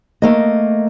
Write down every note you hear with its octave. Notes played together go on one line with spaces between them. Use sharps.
A3 A#3 D#5